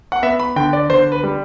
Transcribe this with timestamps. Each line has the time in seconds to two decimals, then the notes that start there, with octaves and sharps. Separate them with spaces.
0.12 F#5
0.23 B3 E5
0.40 B5
0.56 D3 G5
0.73 D5
0.89 D3 C5
1.12 B4
1.23 G3